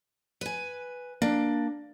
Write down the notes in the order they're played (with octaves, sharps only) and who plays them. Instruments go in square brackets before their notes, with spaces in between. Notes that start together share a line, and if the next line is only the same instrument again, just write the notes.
[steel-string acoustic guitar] B4 G#5
[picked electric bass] A#3 [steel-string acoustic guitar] D4